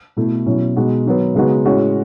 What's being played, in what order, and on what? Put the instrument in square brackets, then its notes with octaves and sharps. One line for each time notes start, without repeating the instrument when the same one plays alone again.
[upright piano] B2 A3 E4
B2 F#3 C#4 E4
B2 G#3 D#4 F#4
D#3 F#3 B3
C#3 G#3 B3 D#4 F#4
A2 G#3 C#4 F#4